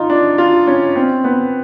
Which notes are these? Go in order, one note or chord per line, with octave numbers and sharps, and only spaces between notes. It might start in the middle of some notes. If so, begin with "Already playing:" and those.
Already playing: D#4 F4
D4
F4
C#4
C4
B3